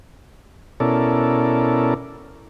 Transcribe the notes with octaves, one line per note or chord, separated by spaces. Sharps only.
B2 C#4 E4 A4 A#4 D5